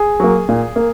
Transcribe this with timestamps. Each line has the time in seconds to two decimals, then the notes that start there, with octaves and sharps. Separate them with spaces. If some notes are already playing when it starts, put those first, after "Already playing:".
Already playing: G#4
0.20 F#3 A#3
0.49 A#2
0.76 A#3